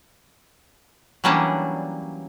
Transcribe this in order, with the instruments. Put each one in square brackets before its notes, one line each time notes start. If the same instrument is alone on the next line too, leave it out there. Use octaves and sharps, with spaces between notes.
[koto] E3 F#3 G3 A#3 C#4 D4